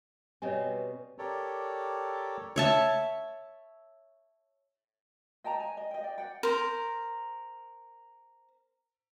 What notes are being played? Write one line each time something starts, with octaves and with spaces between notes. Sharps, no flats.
B2 G3 C4 C#5 D#5 G#5
G4 A4 A#4 C#5 D5
C#5 E5 A5
D#5 G5 A5 A#5
G#5
D#5
D#5 G5
D5 G5
D5 F#5 G5
A#4 C5